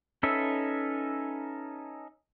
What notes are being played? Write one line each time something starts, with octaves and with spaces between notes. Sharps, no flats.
C#4 D#4 A4 B4 E5